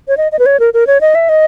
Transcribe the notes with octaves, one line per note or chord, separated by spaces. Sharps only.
C#5
D#5
D#5
B4
C#5
A#4
A#4
C#5
D#5
E5
D#5